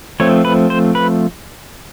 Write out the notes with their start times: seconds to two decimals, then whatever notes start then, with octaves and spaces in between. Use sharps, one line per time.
0.20 F3 A3 C4 C#5
0.45 B4
0.70 C5
0.95 B4